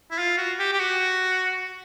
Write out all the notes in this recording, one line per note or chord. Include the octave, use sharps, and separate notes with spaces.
E4
F4
F#4
G4
G4
F#4